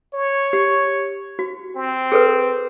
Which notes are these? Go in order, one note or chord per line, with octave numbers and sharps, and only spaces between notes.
C#5
G4
F#4
C4
G#4 A4 B4